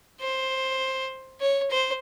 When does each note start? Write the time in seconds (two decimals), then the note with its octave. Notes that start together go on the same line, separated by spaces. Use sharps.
0.20 C5
1.40 C#5
1.70 C5